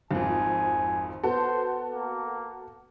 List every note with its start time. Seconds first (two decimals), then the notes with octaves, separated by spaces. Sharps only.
0.11 G#1 F2 G#5
1.23 B3 F#4 A4 C5
1.91 A#3